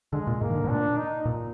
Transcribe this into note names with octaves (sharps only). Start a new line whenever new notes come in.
D3 G#3
A#2
G#2 A#3
D#3
D3
G#2
A#2 D4
D#4
A#2